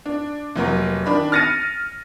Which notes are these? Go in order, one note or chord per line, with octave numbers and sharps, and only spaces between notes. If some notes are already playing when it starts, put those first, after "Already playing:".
D4
F1 F#3 A#3 A#4
D#3 D4 B5
F6 A6 A#6 C#7 D#7